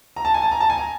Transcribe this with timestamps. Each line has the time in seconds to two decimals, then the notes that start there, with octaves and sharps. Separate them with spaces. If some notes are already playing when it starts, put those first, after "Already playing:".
0.16 A#5
0.25 A5
0.34 G#5
0.42 A5
0.52 A#5
0.60 A5
0.70 G#5
0.78 A#5